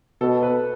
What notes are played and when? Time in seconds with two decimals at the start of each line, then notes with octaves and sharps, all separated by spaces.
0.21 B2 A4
0.43 B4